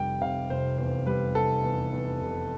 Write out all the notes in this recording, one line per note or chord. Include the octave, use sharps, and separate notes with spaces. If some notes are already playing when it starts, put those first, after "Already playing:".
Already playing: F1 G3 G5
C3 F5
F1 C5
E2 C5
G3 B4
F1 A4
E2
E2
F1